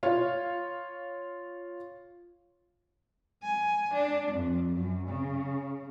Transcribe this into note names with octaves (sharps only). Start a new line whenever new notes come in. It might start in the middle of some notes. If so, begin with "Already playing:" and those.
F4 C#5 F5
G#5
D4
F2
F#2
C#3